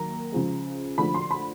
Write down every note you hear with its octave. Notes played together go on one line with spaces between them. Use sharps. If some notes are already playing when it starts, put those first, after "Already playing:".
Already playing: D#3 F#3 A#3 A#5
C#3 F3 G#3
D3 F3 A3 B5
C6
B5